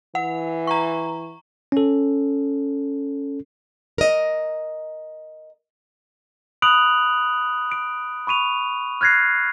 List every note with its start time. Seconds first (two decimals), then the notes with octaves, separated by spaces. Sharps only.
0.15 E3 F#5
0.67 A#5 C#6
1.72 C#4 A4
3.98 A#4 D#5
6.62 B5 D#6 F#6 D7 F7 F#7
7.72 D7
8.27 B5 C#6 D#7 F7
9.01 F6 F#6 G#6 A#6 C7